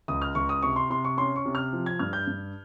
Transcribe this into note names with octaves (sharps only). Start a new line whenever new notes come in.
C#2 D#6
F6
C#2 C#6
D#6
C3 C#6
C6
C3 C6
C#6
C#4 C6
C#6
C3
F6
F3
G#6
G2 F6
G6
G2